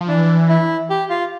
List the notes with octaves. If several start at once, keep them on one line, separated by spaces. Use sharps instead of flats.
F3
E3 D4
E4
G4
F4